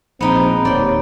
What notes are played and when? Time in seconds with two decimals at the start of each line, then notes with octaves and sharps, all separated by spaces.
0.21 A#1 G#2 B3 C4 D#4 G5
0.65 D1 D#2 C#5 D5 G5